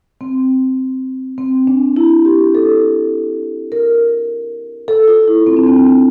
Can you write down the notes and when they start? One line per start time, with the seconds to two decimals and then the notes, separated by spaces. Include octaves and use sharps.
0.21 C4
1.38 C4
1.67 D4
1.97 E4
2.25 G4
2.55 A4
3.72 A#4
4.88 A4
5.08 F4
5.28 E4
5.47 C4
5.57 D4
5.67 C4